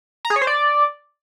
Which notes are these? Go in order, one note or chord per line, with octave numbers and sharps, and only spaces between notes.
A#5
G#4
C#5
C5
D5